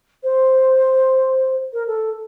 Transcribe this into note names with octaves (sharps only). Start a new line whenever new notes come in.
C5
A#4
A4